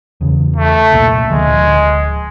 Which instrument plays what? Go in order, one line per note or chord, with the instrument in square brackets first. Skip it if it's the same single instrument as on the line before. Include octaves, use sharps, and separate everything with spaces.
[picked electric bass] E2 C#3
[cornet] A3
[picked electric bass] C2 A#2
[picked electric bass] D1 D3 F3 [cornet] G#3